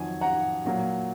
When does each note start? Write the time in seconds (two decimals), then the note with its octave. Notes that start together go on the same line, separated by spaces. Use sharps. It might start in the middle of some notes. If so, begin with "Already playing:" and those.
Already playing: F2 D#3 F#3 G#5
0.21 F#5 A#5
0.65 A#2 F#3 A#3